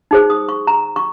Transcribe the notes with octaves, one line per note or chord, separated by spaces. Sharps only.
D#4 G#4 C5
D#6
C#6
A#5
C#6